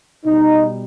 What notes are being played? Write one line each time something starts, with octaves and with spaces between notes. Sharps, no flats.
B2 G3 D#4